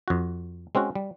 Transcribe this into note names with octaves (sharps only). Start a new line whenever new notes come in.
F2 F#4
G#3 C4 C#4 F#4
G3